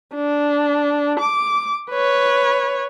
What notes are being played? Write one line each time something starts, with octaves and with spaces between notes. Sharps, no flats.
D4
D6
B4 C#5